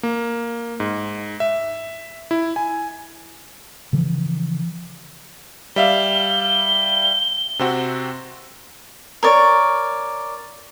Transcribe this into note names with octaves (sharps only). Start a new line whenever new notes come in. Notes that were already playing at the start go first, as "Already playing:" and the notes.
A#3
G#2
E5
E4
G#5
C#3 E3 F3
G3 E5 F5 G7
C3 C4 F#4
A#4 C#5 D5